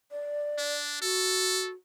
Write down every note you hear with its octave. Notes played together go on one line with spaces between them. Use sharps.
D5
D4
F#4 A4